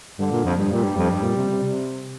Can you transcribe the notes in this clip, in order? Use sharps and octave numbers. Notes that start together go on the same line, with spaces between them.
G2 D3
A#2
F2
G2
A#2 G3
G2
F2
G2
A#2
C3
C3
C3